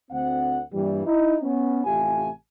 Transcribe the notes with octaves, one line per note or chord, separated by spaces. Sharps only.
D2 C4 F#5
G2 A#2 E3 G3
D#4 E4
B3 C#4
A1 C3 A3 F4 G4 G#5